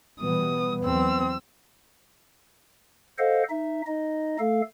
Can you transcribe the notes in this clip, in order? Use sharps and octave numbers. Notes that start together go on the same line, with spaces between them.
B2 E3 G3 B3 D#6
E2 F#3 C4 E6
A4 C5 D#5 F5 F#5
D#4 E5
D#4 D#5
A3 A4 F5